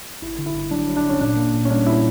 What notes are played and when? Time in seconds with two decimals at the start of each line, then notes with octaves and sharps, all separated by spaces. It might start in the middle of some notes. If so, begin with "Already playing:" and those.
0.22 G1 E4
0.39 D3
0.46 E4
0.55 G1
0.71 F#3 D4
0.88 F#3
0.96 D4
1.04 G1
1.09 C#4
1.21 A#2 D4
1.37 A#3
1.53 A#2
1.65 C#4
1.70 G3 D4
1.86 A#2 E4